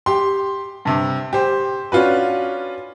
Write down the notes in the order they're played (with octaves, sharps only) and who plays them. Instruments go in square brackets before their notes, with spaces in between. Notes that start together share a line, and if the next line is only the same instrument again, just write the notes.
[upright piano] G4 C6
G2 C3
G4 C5
C#4 D4 F4 F#4 B4